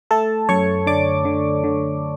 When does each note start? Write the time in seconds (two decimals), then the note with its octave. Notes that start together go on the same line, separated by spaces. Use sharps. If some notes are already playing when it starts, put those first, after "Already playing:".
0.11 A3 A4 A5
0.49 F#2 C#5 C#6
0.86 D3 D5 D6
1.25 D3
1.64 D3